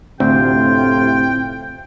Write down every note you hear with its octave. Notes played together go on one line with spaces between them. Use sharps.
D2 A2 C3 C4 F4 G5